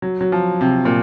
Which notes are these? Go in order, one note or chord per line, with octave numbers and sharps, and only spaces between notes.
F#3
F#3
F3
C3
A#2